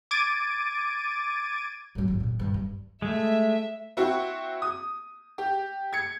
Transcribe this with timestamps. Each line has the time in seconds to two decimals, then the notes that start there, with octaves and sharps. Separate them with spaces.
0.11 D6 G#6 A6 D7 D#7
1.95 G2 F#3
2.08 G#1 D#2
2.20 F#2 A#2
2.39 G2 E3
2.54 G2
3.02 G#3 A3 E5
3.97 C4 E4 F#4
4.62 D#6
5.38 G4
5.93 G#6 C#7